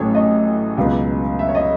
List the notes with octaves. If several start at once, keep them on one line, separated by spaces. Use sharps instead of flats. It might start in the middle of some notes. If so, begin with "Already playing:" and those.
Already playing: A1 A2 F#3 A3 C#5
D#5
C#2 B2 F#3 B3
E5
C#5
D#5